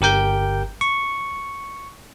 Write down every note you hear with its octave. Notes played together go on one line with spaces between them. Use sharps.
G1 G4 A#4 G5 G6
C#6